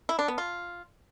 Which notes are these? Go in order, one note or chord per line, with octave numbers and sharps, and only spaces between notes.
E4
D4
B3
F4